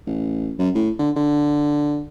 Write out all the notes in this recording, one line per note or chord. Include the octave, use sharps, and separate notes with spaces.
A1
F#2
A2
D3
D3